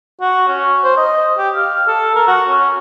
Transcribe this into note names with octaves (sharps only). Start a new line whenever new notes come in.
F#4
C#4
C5
D#5
G4
F5
A4
A#4
F#4
C#4